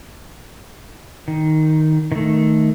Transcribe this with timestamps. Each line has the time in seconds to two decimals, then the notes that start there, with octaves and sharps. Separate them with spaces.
1.28 D#3
2.12 D#3 A3